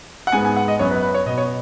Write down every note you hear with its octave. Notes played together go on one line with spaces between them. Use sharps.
F#5
G#2 G#3 B3 G#5
G#5
F#5
D#5
F#2 F#3 B3 C#5
B4
B4
C#5
B2 B3 D#5
C#5